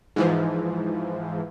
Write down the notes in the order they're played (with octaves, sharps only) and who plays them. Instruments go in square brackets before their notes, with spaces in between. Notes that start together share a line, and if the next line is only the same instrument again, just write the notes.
[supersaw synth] G#2 E3 F3